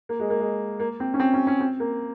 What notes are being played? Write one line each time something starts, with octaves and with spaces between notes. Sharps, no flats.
A#3
G#3
A#3
G#3
A#3
C4
C#4
C4
C#4
C#4
C4
A#3